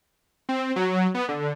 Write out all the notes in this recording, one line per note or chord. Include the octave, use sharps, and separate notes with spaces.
C4
F#3
B3
D3